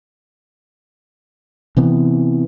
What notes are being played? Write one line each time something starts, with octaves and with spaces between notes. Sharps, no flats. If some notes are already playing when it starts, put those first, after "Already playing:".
C3 E3 B3